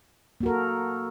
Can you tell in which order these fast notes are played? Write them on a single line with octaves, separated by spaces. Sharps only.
A#3 F#4 A#4 A4